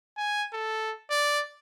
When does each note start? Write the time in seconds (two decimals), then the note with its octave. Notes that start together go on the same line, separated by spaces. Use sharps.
0.17 G#5
0.53 A4
1.10 D5